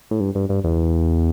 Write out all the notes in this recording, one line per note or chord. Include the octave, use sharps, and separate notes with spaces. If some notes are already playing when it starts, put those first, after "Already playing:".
A2
G2
G2
G2
E2